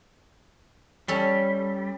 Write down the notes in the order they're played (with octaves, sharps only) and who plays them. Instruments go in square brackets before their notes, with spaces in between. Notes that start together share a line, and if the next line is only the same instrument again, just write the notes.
[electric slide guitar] G3 [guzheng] C#4 A4